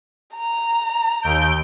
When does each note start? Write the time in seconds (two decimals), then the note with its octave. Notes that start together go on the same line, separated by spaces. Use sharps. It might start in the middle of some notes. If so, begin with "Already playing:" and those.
0.35 A#5
1.22 D#2 G6 D7